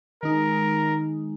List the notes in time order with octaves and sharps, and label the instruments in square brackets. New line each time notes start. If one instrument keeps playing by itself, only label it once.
[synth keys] D#3 G#3 D#4 [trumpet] A#4